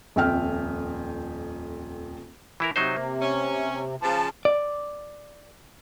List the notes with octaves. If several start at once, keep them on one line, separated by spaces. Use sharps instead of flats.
D#1 F2 E5 G5 F6
E3 E4 A#4
C3 F#3 D#4 C5
A#3
C#4
C#3 F3 A5
D5